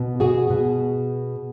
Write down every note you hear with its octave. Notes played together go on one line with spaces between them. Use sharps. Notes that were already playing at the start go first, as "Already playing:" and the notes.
Already playing: B2
F#4 G#4
B2